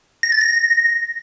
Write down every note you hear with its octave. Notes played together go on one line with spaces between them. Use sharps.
A#6
A6
A#6